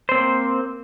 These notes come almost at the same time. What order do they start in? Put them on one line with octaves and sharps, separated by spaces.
C5 C4 A#3